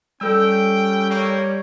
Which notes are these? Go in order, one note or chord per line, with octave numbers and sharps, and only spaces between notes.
G3 C#4 A4 G5 E6
A#3 C#5